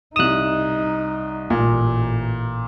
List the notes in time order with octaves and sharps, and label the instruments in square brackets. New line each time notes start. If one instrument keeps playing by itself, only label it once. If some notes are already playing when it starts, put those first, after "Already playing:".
[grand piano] C2 E7 [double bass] D#4 [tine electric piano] D#6 F#6
[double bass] A1 [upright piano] A#2